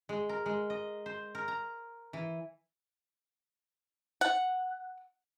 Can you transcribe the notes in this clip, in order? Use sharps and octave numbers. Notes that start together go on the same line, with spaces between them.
G#3
A#4
G#3
D#5
C5
A#4
A#5
E3
F#5